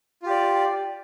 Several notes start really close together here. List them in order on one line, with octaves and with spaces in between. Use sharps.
F4 G4 D5